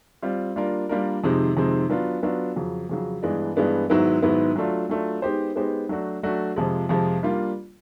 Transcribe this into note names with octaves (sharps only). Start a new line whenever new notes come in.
G3 C4 F4
G3 A#3 D4 F4 A#4
G3 A#3 D4 F4 A#4
F2 C3 D#3 G#3 C4
F2 C3 D#3 G#3 C4
F#3 B3 D4 F4
F#3 B3 D4 F4
F2 C#3 F#3
F2 C#3 F#3
G2 E3 G#3 B3 D4
G2 E3 G#3 B3 D4
G#2 D#3 F#3 B3 E4
G#2 D#3 F#3 B3 E4
F#3 A3 D4 F4
F#3 A3 D4 F4
G#3 B3 D#4 G4 C5
G#3 B3 D#4 G4 C5
F#3 A3 D4 F#4
F#3 A3 D4 F#4
F2 C3 F3 G#3
F2 C3 F3 G#3
G3 A#3 D4 F4